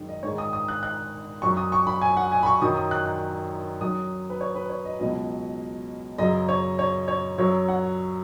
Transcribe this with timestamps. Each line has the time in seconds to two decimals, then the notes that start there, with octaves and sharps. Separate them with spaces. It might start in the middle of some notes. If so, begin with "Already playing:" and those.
Already playing: F#2 D#3 G#3
0.09 D#5
0.23 G#2 D#3 G#3 C#5
0.38 D#6
0.53 D#6
0.68 F#6
0.83 F#6
1.42 F#2 F#3 C#6
1.57 D#6
1.72 C#6
1.87 B5
2.01 G#5
2.17 F#5
2.32 G#5
2.43 B5
2.46 C#6
2.62 F#2 D#3 F#3 D#6
2.76 D#6
2.91 F#6
3.06 F#6
3.81 F#2 F#3 D#6
4.30 B4
4.41 C#5
4.55 B4
4.70 C#5
4.85 D#5
4.99 C#2 B2 F#3 D#5
6.18 F#2 C#3 F#3 D#5
6.49 C#5
6.79 C#5
7.08 C#5
7.38 F#2 F#3 C#5
7.68 F#5